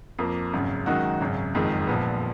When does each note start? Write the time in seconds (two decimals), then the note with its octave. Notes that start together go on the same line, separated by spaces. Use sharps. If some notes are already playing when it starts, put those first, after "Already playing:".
0.19 F2 F3 A#3
0.53 G#1 F#2 C#3
0.86 F#2 D#3 G#3 D#4 F#4
1.21 G#1 F#2 C#3
1.55 F#1 F2 D#3 G#3
1.87 A#1 A#2 F3 B3